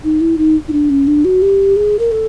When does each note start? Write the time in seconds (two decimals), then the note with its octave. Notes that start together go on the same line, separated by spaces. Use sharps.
0.04 D#4
0.21 E4
0.38 D#4
0.68 D#4
0.73 D4
0.90 C#4
1.07 D4
1.25 F#4
1.42 G4
1.76 G#4
1.99 A#4
2.12 A4